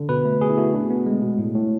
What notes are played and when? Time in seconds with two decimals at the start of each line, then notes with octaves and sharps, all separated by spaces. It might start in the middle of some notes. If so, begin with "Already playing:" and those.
Already playing: D3
0.09 B2 B4
0.25 A3
0.41 B2 G#4
0.50 E4
0.58 A3 F#4
0.74 B2 D4
0.90 B3
1.06 G#3
1.22 B2
1.38 A2
1.55 A2